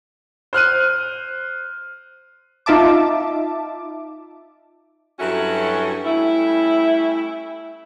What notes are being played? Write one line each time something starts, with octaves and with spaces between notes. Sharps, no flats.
C5 F6 F#6 D#7
D#4 F4 E5 A5 D6
G2 F#3 C#4 E4 F#4 A4
G3 A3 C#4 E4